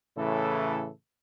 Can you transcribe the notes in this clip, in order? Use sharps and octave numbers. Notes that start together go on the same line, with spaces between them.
A2 C#3 E3 A4